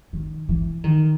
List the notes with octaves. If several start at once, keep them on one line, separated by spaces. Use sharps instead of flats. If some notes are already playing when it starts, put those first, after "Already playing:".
D#3
E3
D#3